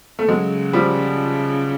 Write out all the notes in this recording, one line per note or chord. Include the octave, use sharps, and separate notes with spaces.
A3
C#3 F#3 G#3
F3 G3